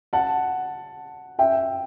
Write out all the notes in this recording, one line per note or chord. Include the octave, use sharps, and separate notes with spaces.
F#5 A5
E5 G5